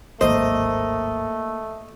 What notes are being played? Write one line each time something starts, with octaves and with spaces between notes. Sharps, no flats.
D1 G#1 A3 A#3 C5 D#5